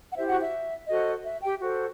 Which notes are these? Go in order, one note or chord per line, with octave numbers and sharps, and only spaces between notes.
F#5
E4 G4 C5 E5
F#4 F#5
E5
F#4 A4 C5 D#5
E5
G4 G5
F#4 A4 C5